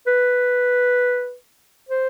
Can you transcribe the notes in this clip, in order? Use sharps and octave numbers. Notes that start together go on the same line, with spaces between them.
B4
C5